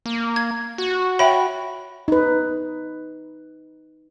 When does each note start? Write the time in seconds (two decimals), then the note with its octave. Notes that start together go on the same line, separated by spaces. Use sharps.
0.06 A#3
0.36 G#6
0.78 F#4
1.19 C#5 E5 G5 B5
2.08 D#4 B4